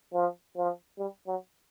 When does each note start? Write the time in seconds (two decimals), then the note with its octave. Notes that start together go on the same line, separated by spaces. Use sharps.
0.13 F3
0.56 F3
0.98 G3
1.27 F#3